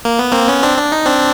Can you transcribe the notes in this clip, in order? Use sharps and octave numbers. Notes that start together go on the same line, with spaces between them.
A#3
B3
A#3 C4
B3 C#4
C4 D4
D4
D#4
C4 D4